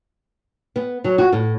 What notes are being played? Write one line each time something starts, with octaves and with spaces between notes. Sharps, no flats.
B3
F#3
F#4
A2